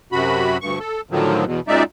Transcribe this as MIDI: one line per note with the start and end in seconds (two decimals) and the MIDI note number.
0.12 0.57 42
0.12 0.57 48
0.12 0.57 66
0.12 0.57 83
0.61 0.79 38
0.61 0.79 43
0.61 0.79 85
0.80 1.01 69
1.11 1.45 45
1.11 1.45 50
1.11 1.45 51
1.11 1.45 53
1.11 1.45 54
1.45 1.60 40
1.45 1.60 47
1.68 1.83 42
1.68 1.83 46
1.68 1.83 56
1.68 1.83 63
1.68 1.83 74
1.68 1.83 76